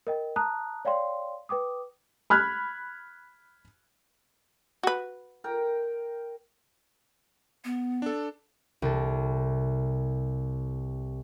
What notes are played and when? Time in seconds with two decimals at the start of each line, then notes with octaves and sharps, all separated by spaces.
0.07 A#4 D#5 G5
0.36 A5 A#5 D#6 F#6
0.85 C#5 D5 F5 G5 C6
1.49 B4 G5 D6 D#6
2.30 B5 F6 F#6 G#6
4.83 F#4 B4
5.44 A#4 G5 A#5
7.65 B3
8.02 D4 A4
8.82 C2 A4